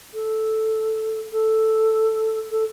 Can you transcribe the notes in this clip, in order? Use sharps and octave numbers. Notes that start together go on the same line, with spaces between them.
A4
A4
A4